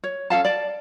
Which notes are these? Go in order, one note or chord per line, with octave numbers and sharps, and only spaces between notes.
C#5
C#4 A4 F5 A5
D5 A5